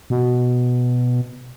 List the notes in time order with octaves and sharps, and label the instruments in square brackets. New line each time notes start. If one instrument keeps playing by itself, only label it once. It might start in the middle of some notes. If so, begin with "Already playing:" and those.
[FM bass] B2